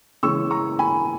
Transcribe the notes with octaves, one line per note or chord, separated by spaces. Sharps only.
C#3 E3 G#3 C#6 E6
A#5 C#6
G#5 B5